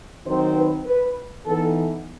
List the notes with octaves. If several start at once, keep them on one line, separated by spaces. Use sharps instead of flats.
D#3 F#3 C4 D#4 C5
B4
B4
E3 B3 D#4 A4